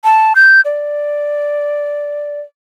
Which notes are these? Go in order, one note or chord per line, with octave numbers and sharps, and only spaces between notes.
A5
G6
D5